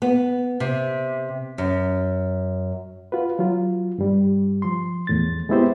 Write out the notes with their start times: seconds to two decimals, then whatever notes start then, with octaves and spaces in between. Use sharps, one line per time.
0.02 B3
0.60 C3
1.58 F#2
3.12 F4 F#4 B4
3.39 F#3 F4
3.98 G2 G3
4.62 F3 C6
5.07 E2 A2 A6
5.49 G#3 B3 C4 E4 G4 C5